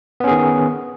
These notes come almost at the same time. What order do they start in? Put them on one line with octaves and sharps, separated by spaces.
B3 C#4 G#4 D#3